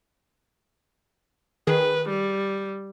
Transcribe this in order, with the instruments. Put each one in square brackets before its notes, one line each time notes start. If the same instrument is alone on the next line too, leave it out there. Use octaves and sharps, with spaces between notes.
[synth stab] D#3 G#4 [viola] B4
[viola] G3